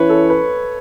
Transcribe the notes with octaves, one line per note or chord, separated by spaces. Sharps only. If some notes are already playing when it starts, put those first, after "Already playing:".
Already playing: E3 C#4 E4 B4 C#5
A4
B4